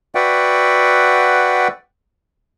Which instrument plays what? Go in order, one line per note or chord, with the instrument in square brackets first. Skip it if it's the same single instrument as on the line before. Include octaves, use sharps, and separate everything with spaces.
[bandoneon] F#4 B4 D5 E5 F#5 G5